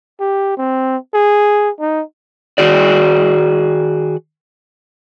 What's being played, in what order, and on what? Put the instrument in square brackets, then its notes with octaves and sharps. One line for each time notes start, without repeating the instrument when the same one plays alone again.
[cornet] G4
C4
G#4
D#4
[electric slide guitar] D#3 F#4 G#4 D5